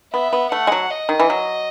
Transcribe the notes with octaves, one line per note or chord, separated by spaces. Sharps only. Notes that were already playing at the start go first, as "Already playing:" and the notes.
B3 E5
B3
A3 F#5
G#3
F#3
D#5
D#3
E3
F#3